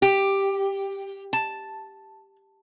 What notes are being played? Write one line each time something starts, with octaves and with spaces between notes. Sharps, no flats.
G4
A5